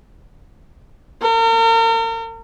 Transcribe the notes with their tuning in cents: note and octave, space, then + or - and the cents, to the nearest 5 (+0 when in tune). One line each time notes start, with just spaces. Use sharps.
A#4 -40